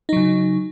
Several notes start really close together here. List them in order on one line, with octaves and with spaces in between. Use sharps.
D#4 F#3 C#3